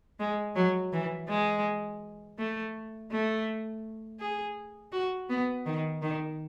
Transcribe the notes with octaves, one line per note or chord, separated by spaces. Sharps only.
G#3
F#3
E3
G#3
A3
A3
G#4
F#4
B3
D#3
D#3